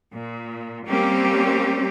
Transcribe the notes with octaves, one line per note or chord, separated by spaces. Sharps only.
A#2
G3 A#3 C4 C#4 G4